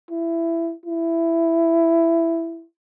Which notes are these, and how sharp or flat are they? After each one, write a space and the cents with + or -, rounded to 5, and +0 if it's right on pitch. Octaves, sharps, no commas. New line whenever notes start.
E4 +15
E4 +10